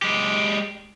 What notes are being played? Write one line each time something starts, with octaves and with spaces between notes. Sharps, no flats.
G#3 G4